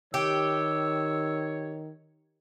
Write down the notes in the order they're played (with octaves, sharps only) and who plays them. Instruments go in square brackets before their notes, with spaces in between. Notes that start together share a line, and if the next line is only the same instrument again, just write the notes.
[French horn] D#3 [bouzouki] G4 [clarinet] C#5 [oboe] E6